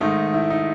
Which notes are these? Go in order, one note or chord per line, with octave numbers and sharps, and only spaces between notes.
G#2 D#3 A3 D#4
E4
D#4